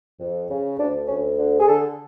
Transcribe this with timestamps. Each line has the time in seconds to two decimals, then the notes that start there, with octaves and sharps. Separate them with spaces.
0.19 F2
0.49 C#3
0.78 D2 D4
1.08 D2 C#4
1.38 D3
1.60 G#4
1.67 D3 A4